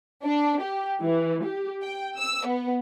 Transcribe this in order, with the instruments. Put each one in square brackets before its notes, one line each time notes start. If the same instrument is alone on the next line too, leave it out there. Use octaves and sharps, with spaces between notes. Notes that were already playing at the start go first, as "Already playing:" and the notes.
[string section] D4
G4
E3
G4
G5
E6
B3